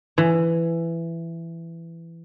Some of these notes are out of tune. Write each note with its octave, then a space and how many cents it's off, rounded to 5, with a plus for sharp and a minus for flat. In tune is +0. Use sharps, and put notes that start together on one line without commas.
E3 +15